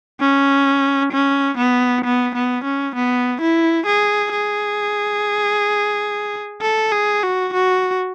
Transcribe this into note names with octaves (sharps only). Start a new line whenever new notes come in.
C#4
C#4
B3
B3
B3
C#4
B3
E4
G#4
G#4
A4
G#4
F#4
F#4